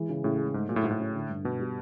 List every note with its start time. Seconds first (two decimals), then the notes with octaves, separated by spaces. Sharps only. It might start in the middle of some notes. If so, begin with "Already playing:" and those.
Already playing: E3 G#3
0.09 C#3
0.24 A2 C#3
0.38 G#3
0.54 G#2 A3
0.69 A#2 F#3
0.76 A2
0.84 G#2 F#4
0.91 A2
1.00 C#4
1.14 D3
1.30 G2
1.44 B2 B3
1.60 G3